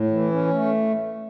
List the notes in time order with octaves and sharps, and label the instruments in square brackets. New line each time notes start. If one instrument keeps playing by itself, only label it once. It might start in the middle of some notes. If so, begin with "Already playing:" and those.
Already playing: [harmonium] A2
E3
C#4
A3